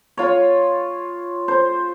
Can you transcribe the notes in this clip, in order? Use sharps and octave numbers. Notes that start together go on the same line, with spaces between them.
F4 C#5
C5